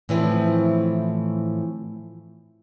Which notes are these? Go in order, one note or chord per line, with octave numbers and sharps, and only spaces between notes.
A2 E3 F3 C4